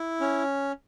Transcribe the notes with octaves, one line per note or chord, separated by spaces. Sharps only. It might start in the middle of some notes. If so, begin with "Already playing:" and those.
Already playing: E4
C#4